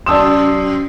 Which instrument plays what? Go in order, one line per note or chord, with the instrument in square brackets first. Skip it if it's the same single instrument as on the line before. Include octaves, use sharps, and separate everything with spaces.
[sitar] F#2 C3 [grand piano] D5 A5 E7 [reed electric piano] C6 D#6 E6